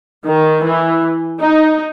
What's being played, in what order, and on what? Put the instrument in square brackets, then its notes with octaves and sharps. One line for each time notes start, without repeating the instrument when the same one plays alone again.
[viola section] D#3
E3
D#4